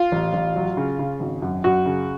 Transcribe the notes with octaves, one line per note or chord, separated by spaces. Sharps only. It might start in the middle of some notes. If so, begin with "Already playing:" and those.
Already playing: F4
A1
A1
F#3
C#3
C#3
G#1
F#2
F#2 F#4
C#3